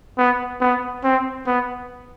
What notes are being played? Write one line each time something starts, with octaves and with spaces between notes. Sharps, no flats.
B3
B3
C4
B3